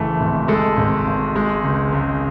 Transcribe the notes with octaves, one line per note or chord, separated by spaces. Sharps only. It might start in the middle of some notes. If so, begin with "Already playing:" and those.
Already playing: F#1 E3 A3
G#1
G#3 A4
G#1
G#1
G#3
C#2
C#2